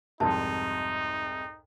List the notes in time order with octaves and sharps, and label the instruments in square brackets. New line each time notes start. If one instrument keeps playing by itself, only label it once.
[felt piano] C2 F2 G#2 [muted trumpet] D#4 [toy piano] A5